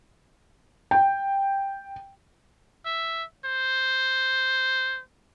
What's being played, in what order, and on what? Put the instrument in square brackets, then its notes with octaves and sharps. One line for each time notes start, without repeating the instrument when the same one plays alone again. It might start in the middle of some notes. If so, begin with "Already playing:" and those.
[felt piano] G5
[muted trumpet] E5
C5